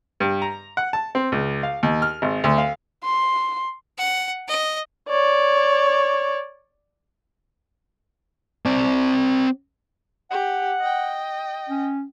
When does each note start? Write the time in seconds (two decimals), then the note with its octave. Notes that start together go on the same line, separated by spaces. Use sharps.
0.20 G2
0.42 A#5
0.77 F#5
0.93 A5
1.15 C4
1.32 C#2
1.63 F5
1.83 D#2
2.02 F6
2.22 G#1
2.44 D2
2.58 F5
3.04 C6
3.98 F#5
4.48 D#5
5.09 C#5 D5
8.66 C4 D5
10.31 G4 F#5
10.80 D#5 G5
11.69 C#4